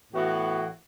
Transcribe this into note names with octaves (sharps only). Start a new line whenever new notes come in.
A2 E3 B3 F#4